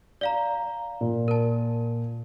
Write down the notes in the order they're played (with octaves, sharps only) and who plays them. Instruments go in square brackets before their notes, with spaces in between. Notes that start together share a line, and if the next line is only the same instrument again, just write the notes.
[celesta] D5 F5 A#5
[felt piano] A#2
[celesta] A#4 A5